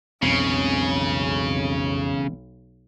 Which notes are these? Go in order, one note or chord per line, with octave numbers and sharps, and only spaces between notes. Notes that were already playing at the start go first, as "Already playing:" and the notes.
E1 B1 F2 C#3 C4